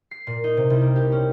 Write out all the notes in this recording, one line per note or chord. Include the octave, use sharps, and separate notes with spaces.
C7
A#2
D#4
C3
C2
A#3
G4
C#4